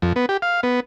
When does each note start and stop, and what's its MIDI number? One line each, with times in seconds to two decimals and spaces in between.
0.02 0.13 41
0.16 0.26 59
0.29 0.37 67
0.42 0.61 77
0.63 0.80 59